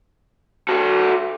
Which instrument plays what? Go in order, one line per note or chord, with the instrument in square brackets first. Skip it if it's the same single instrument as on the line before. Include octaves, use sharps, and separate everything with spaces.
[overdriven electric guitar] F#4 A4